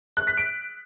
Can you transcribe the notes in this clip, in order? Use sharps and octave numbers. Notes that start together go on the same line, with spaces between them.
F#6
B6
D7